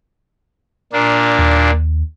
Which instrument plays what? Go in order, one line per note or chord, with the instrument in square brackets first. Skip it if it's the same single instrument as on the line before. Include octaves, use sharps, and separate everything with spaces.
[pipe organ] A#2 A#3 D4
[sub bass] D#2